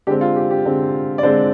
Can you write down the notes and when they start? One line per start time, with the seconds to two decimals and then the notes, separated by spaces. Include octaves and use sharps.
0.07 D3 G#3 C4 G4
0.21 F4
0.36 G4
0.51 G4
0.66 D3 G#3 C4
1.18 D5
1.23 D3 G#3 C4 C5